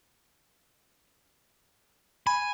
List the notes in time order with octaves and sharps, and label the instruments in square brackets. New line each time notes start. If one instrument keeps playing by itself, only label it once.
[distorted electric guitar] G#5 [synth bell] B5